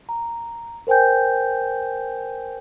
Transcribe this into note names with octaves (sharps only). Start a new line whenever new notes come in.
A#5
A#4 C5 G5 G#5 G6